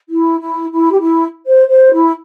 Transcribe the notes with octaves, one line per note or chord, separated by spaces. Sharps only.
E4
E4
E4
G4
E4
C5
C5
E4